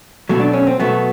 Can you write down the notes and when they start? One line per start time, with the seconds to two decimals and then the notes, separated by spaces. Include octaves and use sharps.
0.29 B2 F#3 A3
0.40 D4
0.53 C#4
0.67 C4
0.80 B2 F#3 A3 B3